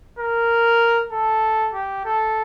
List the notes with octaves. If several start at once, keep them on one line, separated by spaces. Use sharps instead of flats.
A#4
A4
G4
A4